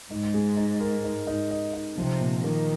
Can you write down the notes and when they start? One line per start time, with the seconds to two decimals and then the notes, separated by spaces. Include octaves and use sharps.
0.11 G#2 D#4
0.34 G#3
0.57 D#4
0.81 A#4
1.04 D#4
1.27 D#4
1.51 D#5
1.74 D#4
1.98 C3 F3
2.21 A#2
2.44 D#3 A#3